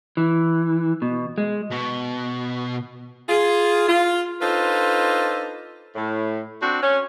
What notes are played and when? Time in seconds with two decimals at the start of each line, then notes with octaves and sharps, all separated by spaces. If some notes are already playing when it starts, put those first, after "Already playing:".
0.17 E3
1.02 B2
1.38 G#3
1.71 B2
3.29 F4 G#4
3.89 F4
4.41 D4 D#4 F4 A4 B4 C5
5.95 A2
6.61 C4 D4 F#4
6.82 C#4